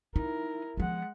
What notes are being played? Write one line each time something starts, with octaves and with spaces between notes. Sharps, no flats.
D#4 E4 A#4
F3 G#3 B3 F#5